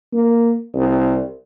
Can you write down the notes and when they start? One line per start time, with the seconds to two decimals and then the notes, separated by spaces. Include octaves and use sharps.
0.13 A#3
0.75 C2